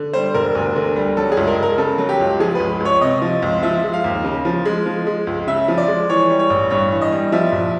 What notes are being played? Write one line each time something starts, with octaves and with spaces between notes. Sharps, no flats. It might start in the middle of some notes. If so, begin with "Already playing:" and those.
Already playing: D3
G3 C5
E1 A#4
D2
D3
G3
F#3 A4
G#4
C#2
A#4
C#2 A#4
C#3 A4
F#3
G4
C#2
F3 G#4
C#2 B4
C#2
C#5
C3 D#5
F3
C#2
F3 E5
G#3
F5
D#2
C#3
F3
G#3
F3
G#3
C#2
C#3 E5
F3
D5
G#3
E3 C#5
G3
C#5
A1
G2 C#5
E3
D#5
G3
F3 E5
A#1